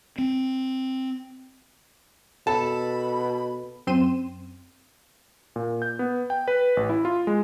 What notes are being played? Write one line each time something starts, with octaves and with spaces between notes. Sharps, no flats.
C4
B2 A4 A5 B5
F#2 C4 C6 D#7 E7
A#2
G6
B3
G5
B4
A1
E4
F4
G#3